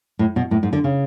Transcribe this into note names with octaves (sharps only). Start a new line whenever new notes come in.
A2
B2
A2
G#2
D3
C#3